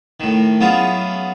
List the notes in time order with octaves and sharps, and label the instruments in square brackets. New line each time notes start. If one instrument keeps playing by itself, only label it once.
[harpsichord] A2 D#3
F#3 B3 C#4 E4 F4 G#4